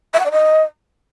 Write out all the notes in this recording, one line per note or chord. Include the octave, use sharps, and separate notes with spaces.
E5
F#5
D5
D#5